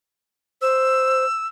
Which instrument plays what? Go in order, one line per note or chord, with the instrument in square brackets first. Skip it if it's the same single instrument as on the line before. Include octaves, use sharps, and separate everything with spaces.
[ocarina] C5 [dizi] E6